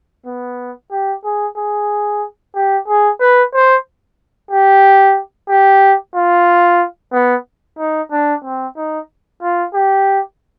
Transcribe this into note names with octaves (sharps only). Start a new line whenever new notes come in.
B3
G4
G#4
G#4
G4
G#4
B4
C5
G4
G4
F4
B3
D#4
D4
C4
D#4
F4
G4